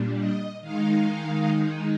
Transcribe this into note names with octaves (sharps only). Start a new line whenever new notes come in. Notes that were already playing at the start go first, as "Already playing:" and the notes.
Already playing: A#2 G3 D4
D#5
D#3 G#3 D#4 F5